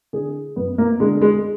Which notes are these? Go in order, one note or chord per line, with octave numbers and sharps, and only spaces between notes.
D3 G#4
F#2 B3
A#3
D3 G#3
G#3